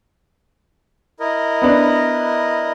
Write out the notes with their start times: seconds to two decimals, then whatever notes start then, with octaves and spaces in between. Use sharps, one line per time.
1.20 E4 A#4 D#5
1.62 B3 D4